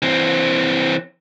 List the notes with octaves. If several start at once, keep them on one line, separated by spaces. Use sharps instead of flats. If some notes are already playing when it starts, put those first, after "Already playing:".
E3 C4